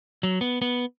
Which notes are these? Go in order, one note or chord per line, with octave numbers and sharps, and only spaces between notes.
F#3
B3
B3